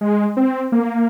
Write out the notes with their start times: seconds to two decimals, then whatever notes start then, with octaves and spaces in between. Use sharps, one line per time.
0.01 G#3
0.37 C4
0.72 A#3